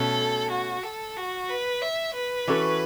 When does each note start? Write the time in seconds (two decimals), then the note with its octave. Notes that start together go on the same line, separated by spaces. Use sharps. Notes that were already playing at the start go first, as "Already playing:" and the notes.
Already playing: B2 A3 C#4 A4
0.51 F#4
0.83 A4
1.17 F#4
1.49 B4
1.82 E5
2.15 B4
2.47 E3 C#4 F#4 A4